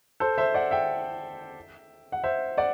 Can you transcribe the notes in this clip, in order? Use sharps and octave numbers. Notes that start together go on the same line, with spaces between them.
A4 C5
C5 E5
D5 F#5
E5 G5
F#5
C5 E5
D5 F#5